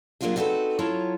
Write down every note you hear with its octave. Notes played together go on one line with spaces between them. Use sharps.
F#3 A#3 D4 F4 G4 G#4
C4 D#4 F#4 G4 A4 B4
F#3 E4 F4 C#5 A5 A#5